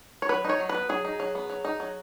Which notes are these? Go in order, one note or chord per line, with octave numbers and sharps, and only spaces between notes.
C#5
F#3 B4
D#4 C#5
F#3
B4
B3
F#3 G#4
D#4
F#3
B3
F#3
D#4
F#3